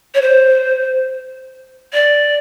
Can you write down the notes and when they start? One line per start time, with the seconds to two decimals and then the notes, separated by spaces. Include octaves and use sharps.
0.14 C#5
0.21 C5
1.93 D5